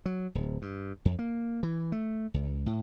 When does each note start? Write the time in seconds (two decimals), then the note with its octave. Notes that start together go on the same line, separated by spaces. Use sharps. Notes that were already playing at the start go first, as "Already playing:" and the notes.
0.06 F#3
0.35 D1
0.62 G2
1.05 F2
1.19 A#3
1.63 E3
1.92 A3
2.34 C#2
2.66 A2